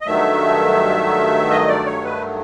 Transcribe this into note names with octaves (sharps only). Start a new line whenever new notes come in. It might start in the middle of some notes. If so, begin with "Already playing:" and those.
D#5
G2 D#3 F#3 A3 E5
D#5
D5
C#5
B4